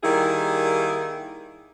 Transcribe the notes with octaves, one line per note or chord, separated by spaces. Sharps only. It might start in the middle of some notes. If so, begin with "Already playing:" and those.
D#3 G3 A#3 E4 G#4